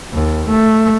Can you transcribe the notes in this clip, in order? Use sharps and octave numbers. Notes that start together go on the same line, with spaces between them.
D#2
A3